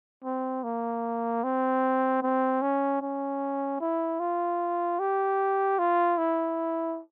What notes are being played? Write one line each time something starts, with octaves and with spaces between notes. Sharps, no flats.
C4
A#3
C4
C4
C#4
C#4
E4
F4
G4
F4
E4